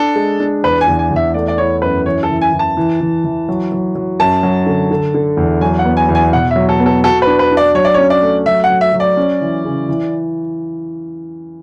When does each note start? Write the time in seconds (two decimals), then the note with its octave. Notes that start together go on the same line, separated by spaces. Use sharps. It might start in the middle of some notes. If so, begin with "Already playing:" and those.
Already playing: D4 A4
0.15 G#3
0.40 D4
0.63 E2 B4
0.81 G#5
0.88 E2
0.99 G#5
1.11 E2
1.16 E5
1.34 A3 D5
1.48 D5
1.58 E4 C#5
1.82 F#2 B4
2.06 E3 C#5
2.23 A4
2.30 E3
2.42 G#5
2.53 E3
2.59 A5
2.77 E3
3.01 E3
3.24 E3
3.49 F#3
3.72 F#3
3.95 F#3
4.19 F#2 A5
4.43 F#3
4.66 D3
4.91 D3
5.14 D3
5.37 E2
5.61 F#3 G#5
5.79 F#5
5.85 B3
5.97 G#5
6.09 E2
6.15 G#5
6.33 B2 F#5
6.51 E5
6.56 F#3
6.69 A4
6.80 B3
6.86 A4
7.04 F#4 A4
7.22 B4
7.27 D4
7.39 B4
7.51 D4
7.57 D5
7.75 F#3 C#5
7.85 D5
7.94 C#4 C#5
8.10 D5
8.22 A3
8.46 F#3 E5
8.64 F#5
8.69 F#3
8.81 E5
8.93 F#3
9.00 D5
9.17 C#4
9.41 E3
9.65 C#3
9.89 E3